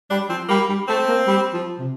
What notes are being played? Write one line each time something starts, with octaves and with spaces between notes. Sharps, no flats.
G3 D4
F3 C4
G3 A#3
G3
A3 C4
A#3
G3
F3
C3